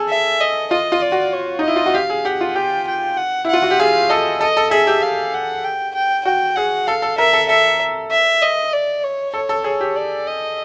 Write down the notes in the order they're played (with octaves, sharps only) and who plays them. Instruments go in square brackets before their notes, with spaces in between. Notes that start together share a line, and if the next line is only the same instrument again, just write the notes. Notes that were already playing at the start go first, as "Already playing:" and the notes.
Already playing: [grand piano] G#4 A4
[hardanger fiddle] E5
D#5
[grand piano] F4 [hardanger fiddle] D#5
[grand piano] F4
[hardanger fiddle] D5
[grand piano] F#4
[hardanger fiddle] C#5
[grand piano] D#4
[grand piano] E4 [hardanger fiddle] D#5
[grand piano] F4
F#4
[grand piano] G4 [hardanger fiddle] F5
[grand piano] G#4
[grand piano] G4 [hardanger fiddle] F#5
[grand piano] F4
[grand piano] G4 [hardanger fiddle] G5
[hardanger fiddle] G5
F#5
[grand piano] E4
[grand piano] F4 [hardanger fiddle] F#5
[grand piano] F#4
G4
[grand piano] G#4 [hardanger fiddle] F5
[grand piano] A4 [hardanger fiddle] D#5
[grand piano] A4 [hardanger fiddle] D#5
[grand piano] A4
[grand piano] G#4 [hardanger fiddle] E5
[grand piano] G4
[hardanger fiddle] F5
F#5
G5
G5
[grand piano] F#4 [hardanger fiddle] G5
[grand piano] G#4 [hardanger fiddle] F#5
[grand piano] A4 [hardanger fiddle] F5
[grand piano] A4
[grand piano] A#4 [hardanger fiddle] E5
[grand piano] A4
[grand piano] A4 [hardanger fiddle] E5
[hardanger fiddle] E5
D#5
D5
C#5
[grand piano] A4 [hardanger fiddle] C#5
[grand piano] A4
[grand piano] G#4 [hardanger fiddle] C#5
[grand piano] G4
[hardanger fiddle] D5
D#5